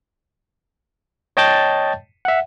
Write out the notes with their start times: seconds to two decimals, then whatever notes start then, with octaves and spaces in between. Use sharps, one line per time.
1.37 C#5 D#5 G5 A5 G6 A6
2.25 E5 F#5